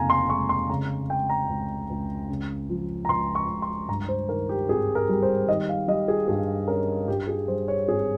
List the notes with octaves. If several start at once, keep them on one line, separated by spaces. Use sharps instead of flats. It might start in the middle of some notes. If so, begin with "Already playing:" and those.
Already playing: F1 D#2 C#3 F5 G#5 A#5
C6
G#3 C#6
C6
C#3 A#5
G#3 G5
A#5
C#2
C#2
C#3
F3
A#5
C#2 C6
C#6
C#2
C6
G2 A#5
C5
D#3 A#4
G4
G#1 G#4
A#4
G3
C5
D#3 D#5
F5
G3 D#5
G#4
G2 G#4
C#4 A#4
G2 G4
G#4
G3 C5
C#5
G#1 G#4